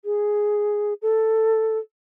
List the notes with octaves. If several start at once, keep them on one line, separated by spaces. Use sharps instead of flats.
G#4
A4